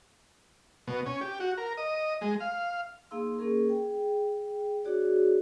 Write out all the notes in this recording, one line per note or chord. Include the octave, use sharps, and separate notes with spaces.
B2
C#4
G4
F#4
A#4
D#5
G#3
F5
A#3 D#4 G#4 F5 C6 E6
A#3 C#4 G#4 A#4
G#4 G5
D4 F#4 G#4 C#5 D5